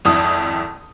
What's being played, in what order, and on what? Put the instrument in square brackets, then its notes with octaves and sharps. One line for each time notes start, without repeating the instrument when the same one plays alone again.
[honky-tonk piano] G#1 F2 E4 D#6